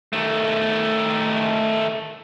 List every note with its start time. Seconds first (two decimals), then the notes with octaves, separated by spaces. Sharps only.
0.13 D#3 A3